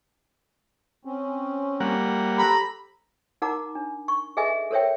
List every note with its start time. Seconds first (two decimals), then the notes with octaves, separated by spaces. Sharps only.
1.05 C4 C#4
1.80 G3 A#3 F#5
2.38 G4 A4 C5 A#5 B5
3.42 D#4 A#4 F#5 A#5 D6
3.75 D4
4.08 C#6
4.37 G#4 A4 B4 D#5 E5 G#5
4.71 A4 A#4 C5 C#5 E5 G5